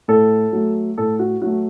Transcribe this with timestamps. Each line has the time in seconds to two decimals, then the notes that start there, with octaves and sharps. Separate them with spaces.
0.08 A2 A4
0.53 F#3 A3
0.98 A2 A4
1.19 F#4
1.42 F#3 A3 F#4